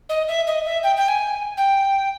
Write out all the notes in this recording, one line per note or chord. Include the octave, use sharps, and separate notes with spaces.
D#5
E5
D#5
E5
G5
G5
G#5
G5